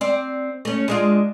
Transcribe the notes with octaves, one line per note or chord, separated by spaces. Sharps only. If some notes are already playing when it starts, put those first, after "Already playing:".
C4 D5
A3 C#4
G#3 D4 F4